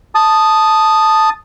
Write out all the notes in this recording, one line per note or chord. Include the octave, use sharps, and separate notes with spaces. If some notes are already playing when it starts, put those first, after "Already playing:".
A5 D#6